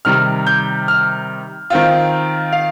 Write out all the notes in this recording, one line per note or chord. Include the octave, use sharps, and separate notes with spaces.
C3 D#3 G3 F6
G6
F6
D#3 C4 F4
F5